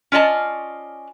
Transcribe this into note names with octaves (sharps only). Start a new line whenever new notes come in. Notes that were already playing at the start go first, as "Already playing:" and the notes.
C#4 F4 D5 D#5 A5